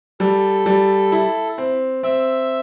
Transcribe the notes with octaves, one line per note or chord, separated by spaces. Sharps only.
G3 A4
G3
E4
C4
C4 E5